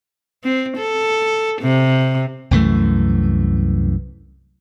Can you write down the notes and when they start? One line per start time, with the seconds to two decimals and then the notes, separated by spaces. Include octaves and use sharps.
0.44 C4
0.78 A4
1.61 C3
2.51 C2 F#2 E3 A3